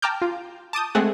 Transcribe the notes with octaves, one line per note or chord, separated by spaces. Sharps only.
G5 A5 A#5 D6 F6 G6
F4
A5 D6 D#6 G6
G#3 A3 C4 G#4 A4 F#5